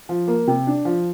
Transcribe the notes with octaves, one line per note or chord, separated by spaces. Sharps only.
F3
A#3
C3
D4
F3